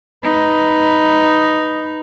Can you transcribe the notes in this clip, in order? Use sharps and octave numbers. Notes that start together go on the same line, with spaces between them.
D#4 B4